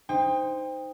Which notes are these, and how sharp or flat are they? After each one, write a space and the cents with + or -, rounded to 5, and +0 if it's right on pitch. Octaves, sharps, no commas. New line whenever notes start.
D#4 +0 C5 -10 G5 +30